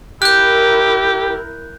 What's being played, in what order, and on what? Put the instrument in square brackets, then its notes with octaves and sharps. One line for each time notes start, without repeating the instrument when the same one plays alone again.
[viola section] E4 A#4 [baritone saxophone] G4 [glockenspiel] F#6 G6